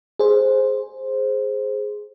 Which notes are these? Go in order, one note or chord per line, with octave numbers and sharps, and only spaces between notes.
G#4 C5